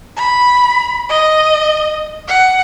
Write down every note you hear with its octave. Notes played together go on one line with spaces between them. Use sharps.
B5
D#5
F#5